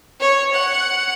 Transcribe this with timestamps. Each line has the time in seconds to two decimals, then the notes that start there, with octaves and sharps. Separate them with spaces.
0.20 C#5
0.54 F#5